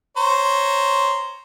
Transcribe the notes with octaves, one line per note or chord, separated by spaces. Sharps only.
C5 C#5 A#5